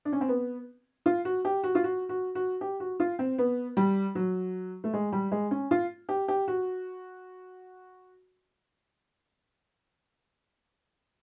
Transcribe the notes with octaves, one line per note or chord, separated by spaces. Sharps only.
D4
C#4
C4
B3
F4
F#4
G4
F#4
F4
F#4
F#4
F#4
G4
F#4
F4
C4
B3
G3
F#3
A3
G#3
G3
G#3
C#4
F4
G4
G4
F#4